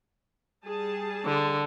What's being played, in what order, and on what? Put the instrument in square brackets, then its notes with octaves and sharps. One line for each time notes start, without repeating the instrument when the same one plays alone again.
[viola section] G3 G#4 A5
[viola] D3